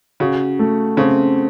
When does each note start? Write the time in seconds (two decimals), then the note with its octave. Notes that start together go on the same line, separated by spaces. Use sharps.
0.20 C#3 F#4
0.59 A3
0.97 C#3 C4